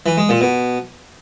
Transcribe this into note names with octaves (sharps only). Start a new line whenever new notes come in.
E3
G#3
A#2
B2